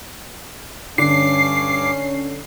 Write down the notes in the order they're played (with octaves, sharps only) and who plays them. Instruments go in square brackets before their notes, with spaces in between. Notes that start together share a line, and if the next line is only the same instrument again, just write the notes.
[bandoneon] G2 D6 [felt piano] D3 [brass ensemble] C#4 [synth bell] C7